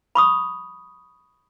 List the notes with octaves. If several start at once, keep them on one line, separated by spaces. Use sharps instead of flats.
B5 C#6 D#6